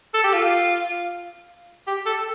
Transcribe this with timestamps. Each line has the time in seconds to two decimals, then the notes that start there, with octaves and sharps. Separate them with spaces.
0.14 A4
0.24 G4
0.34 F4
1.87 G4
2.06 A4